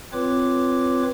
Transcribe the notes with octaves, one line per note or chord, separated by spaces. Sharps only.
C4 F4 B4 C#5 D6